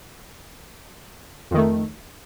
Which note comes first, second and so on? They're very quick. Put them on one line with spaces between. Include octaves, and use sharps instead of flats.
F2 D#3 A3